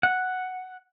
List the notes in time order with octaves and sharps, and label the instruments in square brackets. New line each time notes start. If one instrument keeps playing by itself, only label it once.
[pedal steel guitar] F#5